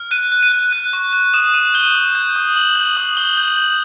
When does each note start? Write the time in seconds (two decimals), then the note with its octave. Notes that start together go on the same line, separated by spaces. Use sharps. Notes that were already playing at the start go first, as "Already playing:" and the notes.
Already playing: F6
0.11 F#6 D#7
0.32 F#6
0.43 D#7
0.52 F#6
0.72 F#6
0.93 C#6
1.13 F#6
1.34 D#6 E7
1.54 D#6 D#7
1.74 G6 G7
1.95 D#6
2.15 G6
2.36 D#6
2.56 D#6 F#7
2.76 G6
2.86 F#7
2.97 D#6
3.17 D#6 G7
3.37 G6
3.48 F#7
3.57 G6